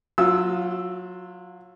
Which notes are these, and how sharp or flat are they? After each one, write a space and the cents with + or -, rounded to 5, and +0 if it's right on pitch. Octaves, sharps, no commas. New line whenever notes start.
F#3 -25 F4 +0 E6 +0